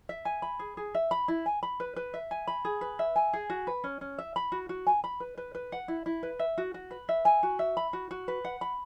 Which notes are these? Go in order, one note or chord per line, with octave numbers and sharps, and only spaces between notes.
E5
G#5
B5
G#4
G#4
E5
B5
E4
G#5
B5
B4
B4
E5
G#5
B5
G#4
B4
E5
G#5
G#4
F#4
B4
C#4
C#4
E5
B5
F#4
F#4
G#5
B5
B4
B4
B4
F#5
E4
E4
B4
E5
F#4
F#4
B4
E5
G#5
F#4
E5
B5
F#4
F#4
B4
F#5
B5